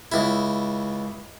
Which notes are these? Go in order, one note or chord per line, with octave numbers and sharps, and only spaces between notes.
C#2 E4